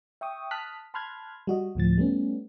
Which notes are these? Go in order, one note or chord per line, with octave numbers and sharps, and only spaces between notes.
E5 G5 C#6 D#6
A5 D#6 F6 F#6 B6
A5 B5 C6 F6 F#6 G#6
G3 F#4 D#5
D2 A2 F3 A6
G3 A3 B3 C#4